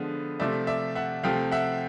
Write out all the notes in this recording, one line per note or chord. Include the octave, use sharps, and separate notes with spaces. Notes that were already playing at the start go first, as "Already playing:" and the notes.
Already playing: D3 F3 G#3 B3
C3 F3 A3 D5 E5
D5 E5
E5 F#5
C3 F3 A3 F5 G5
E5 F#5